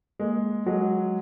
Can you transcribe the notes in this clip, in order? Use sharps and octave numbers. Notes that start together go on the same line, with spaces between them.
G#3 A#3
F#3 G#3